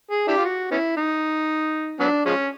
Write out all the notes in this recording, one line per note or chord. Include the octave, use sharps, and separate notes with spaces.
G#4
D4 E4 G4
F4
F#4
B3 C#4 E4
D#4
F#3 B3 D4
F3 G#3 C#4